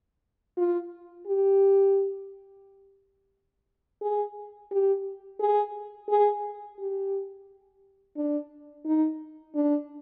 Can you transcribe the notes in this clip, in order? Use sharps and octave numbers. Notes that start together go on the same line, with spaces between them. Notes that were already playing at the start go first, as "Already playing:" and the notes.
F4
G4
G#4
G4
G#4
G#4
G4
D4
D#4
D4